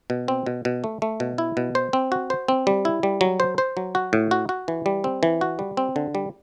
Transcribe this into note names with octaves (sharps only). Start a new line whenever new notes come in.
B2
C4
B2
B2
A3
A3
B2
E4
B2
C5
C4
F#4
C5
C4
G3
E4
G3
F#3
C5
C5
F#3
F#4
A2
F#4
F#4
E3
G3
C4
E3
F#4
G3
C4
D3
G3